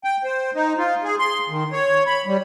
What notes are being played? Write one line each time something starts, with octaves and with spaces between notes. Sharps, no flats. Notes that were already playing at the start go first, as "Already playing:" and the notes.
G5
C5
D#4
F4
G#4
C6
D#3
C#5
B5
G3